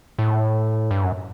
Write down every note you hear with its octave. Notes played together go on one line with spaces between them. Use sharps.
A2
G2
F#2